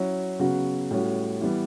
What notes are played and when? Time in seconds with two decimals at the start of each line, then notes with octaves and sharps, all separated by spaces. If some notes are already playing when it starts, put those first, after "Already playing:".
Already playing: F#3 C#4 E4
0.39 C#3 F#3 B3 F#4
0.91 A2 G3 C#4 F#4
1.41 E3 G3 B3